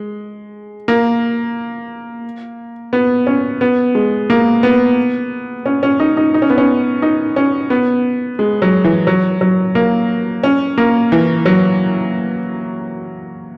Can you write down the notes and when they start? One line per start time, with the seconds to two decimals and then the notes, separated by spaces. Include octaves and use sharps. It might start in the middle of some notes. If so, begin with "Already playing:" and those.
Already playing: G#3
0.88 A#3
2.93 B3
3.27 C#4
3.61 B3
3.95 G#3
4.30 A#3
4.63 B3
5.66 C#4
5.83 C#4
6.00 D#4
6.17 D#4
6.34 D#4
6.42 C#4
6.50 B3
6.58 C#4
7.02 D#4
7.36 C#4
7.70 B3
8.39 G#3
8.62 F#3
8.84 E3
9.07 F#3
9.41 F#3
9.75 A#3
10.43 C#4
10.78 A#3
11.12 E3
11.45 F#3